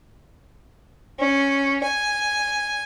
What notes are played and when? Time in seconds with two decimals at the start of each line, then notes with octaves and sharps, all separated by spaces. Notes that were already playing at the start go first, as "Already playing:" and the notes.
1.19 C#4
1.83 G#5